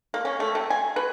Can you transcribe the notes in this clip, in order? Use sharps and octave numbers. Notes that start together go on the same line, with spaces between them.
A#3
C#4
A3
C3
G#5
B4